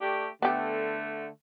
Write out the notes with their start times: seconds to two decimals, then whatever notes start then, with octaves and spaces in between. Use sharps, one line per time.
0.01 A3 D4 G4
0.42 D3 A3 B3 G4